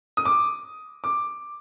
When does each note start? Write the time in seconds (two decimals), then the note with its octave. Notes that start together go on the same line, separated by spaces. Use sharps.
0.17 D#6
0.25 D6
1.04 D6